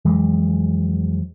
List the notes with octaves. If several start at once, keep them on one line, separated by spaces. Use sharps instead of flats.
F2 E3 F#3 G#3